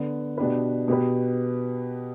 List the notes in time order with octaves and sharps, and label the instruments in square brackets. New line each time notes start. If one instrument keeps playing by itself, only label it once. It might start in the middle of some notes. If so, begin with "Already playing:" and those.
Already playing: [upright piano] D3 B3 D4
B2 B3 D4 G4 B4
B2 B3 G4 B4